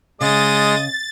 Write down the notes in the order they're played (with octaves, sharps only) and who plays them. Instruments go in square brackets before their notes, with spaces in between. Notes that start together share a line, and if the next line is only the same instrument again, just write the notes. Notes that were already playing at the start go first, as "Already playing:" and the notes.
[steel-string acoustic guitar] C#3 [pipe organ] G#3 [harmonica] D#5 [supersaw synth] A6